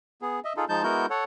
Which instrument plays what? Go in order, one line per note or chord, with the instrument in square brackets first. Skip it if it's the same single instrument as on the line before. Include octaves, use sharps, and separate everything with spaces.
[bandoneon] B3 G#4
D#5 E5
D#4 F4 G#4 A4
F3 G#3 D#4 A5 G6
G#3 B3 E4 F#4 A#4 G6
A4 C#5 F#5